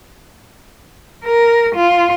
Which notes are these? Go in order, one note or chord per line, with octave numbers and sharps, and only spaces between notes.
A#4
F4